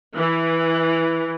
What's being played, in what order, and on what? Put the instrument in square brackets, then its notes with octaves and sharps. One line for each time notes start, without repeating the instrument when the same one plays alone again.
[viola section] E3